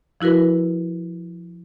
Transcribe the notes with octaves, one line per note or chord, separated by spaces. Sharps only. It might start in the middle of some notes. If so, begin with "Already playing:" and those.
F3 E4 F#4 A#4 B4